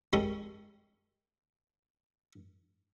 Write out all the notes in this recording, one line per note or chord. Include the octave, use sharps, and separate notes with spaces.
G3 G#3 C#4 A4 A#4